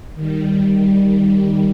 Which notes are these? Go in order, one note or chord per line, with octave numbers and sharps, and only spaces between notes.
D#3 G3